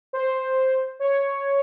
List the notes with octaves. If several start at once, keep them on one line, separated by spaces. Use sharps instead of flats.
C5
C#5